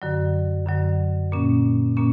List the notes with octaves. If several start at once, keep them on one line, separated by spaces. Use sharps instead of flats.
F#2 D3 F#3
F#2 D3 F#3
A#2 A#3 C#4
A#2 A#3 C#4